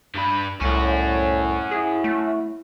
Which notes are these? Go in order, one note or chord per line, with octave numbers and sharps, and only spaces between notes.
G2 B4
C2 A2 C#4 F#4
E4 G#4
A3